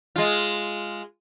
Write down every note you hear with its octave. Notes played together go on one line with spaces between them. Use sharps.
G#3 F4